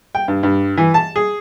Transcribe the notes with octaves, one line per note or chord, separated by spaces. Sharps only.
G5
G2
G2
E3
A5
G#4